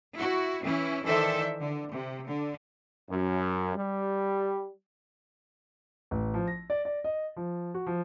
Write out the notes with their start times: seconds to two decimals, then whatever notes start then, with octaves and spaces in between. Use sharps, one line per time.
0.16 E4 F#4
0.64 E3 C#4 E4
1.05 D#3 E3 A4 C5 D5 E5
1.59 D3
1.91 C3
2.27 D3
3.09 F#2
3.75 G3
6.11 A1
6.34 F3
6.48 A#6
6.70 D5
6.85 D5
7.04 D#5
7.37 F3
7.74 F#4
7.87 F3